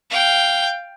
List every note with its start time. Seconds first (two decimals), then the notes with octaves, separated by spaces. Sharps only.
0.11 F5 G5